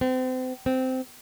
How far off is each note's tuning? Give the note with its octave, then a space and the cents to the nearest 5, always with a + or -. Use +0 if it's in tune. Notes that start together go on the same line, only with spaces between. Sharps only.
C4 -35
C4 -15